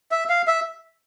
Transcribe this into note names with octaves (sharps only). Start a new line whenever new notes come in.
E5
F5
E5